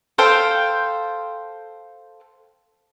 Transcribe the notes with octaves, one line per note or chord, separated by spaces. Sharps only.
A4 C5 F5 G5